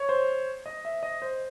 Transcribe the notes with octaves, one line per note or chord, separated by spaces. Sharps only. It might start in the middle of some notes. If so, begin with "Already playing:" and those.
Already playing: C#5
C5
D#5
E5
D#5
C5